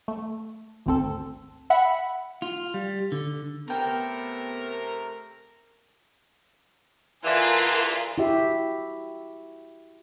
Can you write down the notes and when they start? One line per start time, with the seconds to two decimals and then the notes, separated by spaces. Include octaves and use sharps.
0.08 A3
0.86 G#1 D2 C4 A4
1.70 E5 F#5 B5
2.42 F4
2.74 G3
3.12 D3
3.68 C3 A3 B3 A4 A#4 G5
7.24 D3 E3 F4 G#4 A#4
8.18 E4 F#4 G4 E5